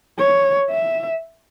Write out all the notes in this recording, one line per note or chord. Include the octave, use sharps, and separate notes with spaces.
C#5
E5